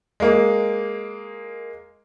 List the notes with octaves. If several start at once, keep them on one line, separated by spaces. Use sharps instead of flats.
G#3 A#3